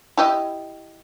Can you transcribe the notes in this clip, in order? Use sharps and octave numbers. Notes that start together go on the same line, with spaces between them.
E4 G4 D#5